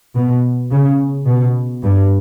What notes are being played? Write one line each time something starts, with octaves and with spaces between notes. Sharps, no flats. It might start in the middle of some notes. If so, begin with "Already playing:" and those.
B2
C#3
B2
G2